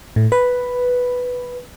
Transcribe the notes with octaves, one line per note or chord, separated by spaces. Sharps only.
A2
B4